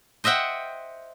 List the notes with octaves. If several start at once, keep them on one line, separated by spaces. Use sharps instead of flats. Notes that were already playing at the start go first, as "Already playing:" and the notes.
C5 D#5 E5 F#5 G5